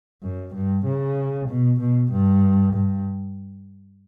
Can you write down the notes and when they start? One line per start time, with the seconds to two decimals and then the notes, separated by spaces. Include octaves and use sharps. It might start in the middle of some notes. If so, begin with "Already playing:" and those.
0.23 F#2
0.55 G2
0.85 C#3
1.48 B2
1.80 B2
2.11 G2
2.73 G2